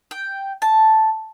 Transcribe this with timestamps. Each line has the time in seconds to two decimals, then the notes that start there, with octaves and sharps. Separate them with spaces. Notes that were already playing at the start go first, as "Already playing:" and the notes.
0.11 G5
0.62 A5